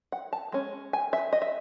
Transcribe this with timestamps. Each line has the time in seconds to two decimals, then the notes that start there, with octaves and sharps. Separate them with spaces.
0.12 F#5
0.33 A5
0.52 G#3 C#4
0.93 G#5
1.13 E5
1.33 D#5
1.42 E5